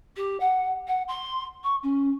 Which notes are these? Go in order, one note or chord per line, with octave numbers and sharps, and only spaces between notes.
G4
F#5
F#5
C6
C#6
C#4